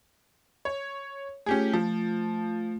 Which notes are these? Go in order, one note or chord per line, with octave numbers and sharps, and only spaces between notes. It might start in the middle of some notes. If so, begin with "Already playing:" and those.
C#5
A3 C#4 F4 G4 G#4
F3